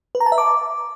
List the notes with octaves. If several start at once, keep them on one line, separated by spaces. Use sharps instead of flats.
B4
A#5
A5
E5
D6